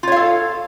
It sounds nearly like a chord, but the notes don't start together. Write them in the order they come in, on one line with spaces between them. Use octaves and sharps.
F4 C#5 F5 A4